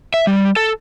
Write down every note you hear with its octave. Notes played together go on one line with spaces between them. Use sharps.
E5
G3
A4